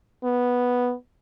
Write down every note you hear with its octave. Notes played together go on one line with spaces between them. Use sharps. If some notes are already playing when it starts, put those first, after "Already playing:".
B3